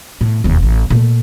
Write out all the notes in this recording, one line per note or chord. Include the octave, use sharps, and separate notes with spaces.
A2
E1 D#2
A1
A#2 A3